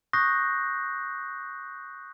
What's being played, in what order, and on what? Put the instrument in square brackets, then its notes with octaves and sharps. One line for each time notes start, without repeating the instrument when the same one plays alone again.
[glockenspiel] C#6 D#6 F#6 G6 A#6 C7